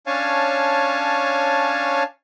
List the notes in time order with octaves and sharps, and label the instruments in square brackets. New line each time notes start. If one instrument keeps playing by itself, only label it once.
[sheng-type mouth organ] C#4 D4 C#5 F5 G#5 A5